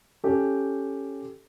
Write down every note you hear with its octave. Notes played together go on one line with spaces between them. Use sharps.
C#4 G4 A4